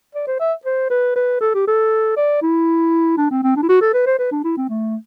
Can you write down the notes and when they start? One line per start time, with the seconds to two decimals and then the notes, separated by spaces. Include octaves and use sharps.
0.15 D5
0.27 C5
0.40 E5
0.66 C5
0.90 B4
1.16 B4
1.41 A4
1.55 G4
1.67 A4
2.17 D5
2.42 E4
3.18 D4
3.31 C4
3.44 C4
3.56 D4
3.63 E4
3.69 F#4
3.81 A4
3.94 B4
4.07 C5
4.19 B4
4.32 D4
4.44 E4
4.57 C4
4.70 A3